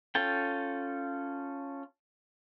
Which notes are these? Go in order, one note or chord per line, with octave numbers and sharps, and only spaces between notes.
C#4 F4 A4 G5